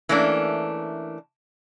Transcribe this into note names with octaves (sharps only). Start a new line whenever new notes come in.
E3 A3 A#3 C#4 D4